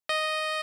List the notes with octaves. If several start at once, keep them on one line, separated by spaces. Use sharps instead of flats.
D#5